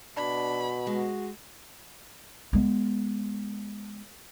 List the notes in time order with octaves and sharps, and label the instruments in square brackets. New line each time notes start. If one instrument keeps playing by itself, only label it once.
[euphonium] B2 [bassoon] D4 [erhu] B5
[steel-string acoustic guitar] G#3 [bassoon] F#4
[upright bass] G#3 B3